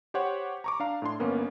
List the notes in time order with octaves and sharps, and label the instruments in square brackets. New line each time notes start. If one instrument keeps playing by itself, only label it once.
[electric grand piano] G4 C5 C#5 F#5
A#5 C#6 D6
D4 F5 A#5
A2 D4 C6
G1 A#3 B3 C#4 A#4